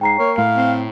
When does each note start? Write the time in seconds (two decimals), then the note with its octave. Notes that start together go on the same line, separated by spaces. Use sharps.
0.01 G#2 G5 A#5 C7
0.19 A#3 C#5
0.38 A2 F5
0.57 C4